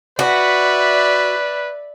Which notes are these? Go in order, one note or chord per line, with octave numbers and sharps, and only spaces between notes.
F#4 B4 D5 E5